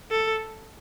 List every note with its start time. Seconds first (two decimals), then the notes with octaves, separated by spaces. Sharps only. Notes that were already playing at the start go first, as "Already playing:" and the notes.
0.11 A4